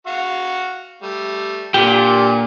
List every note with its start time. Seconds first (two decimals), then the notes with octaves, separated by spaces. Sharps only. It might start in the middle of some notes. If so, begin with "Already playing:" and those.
0.07 F#4 F5 C#6
1.02 G3 A3
1.74 A#2 D3 G4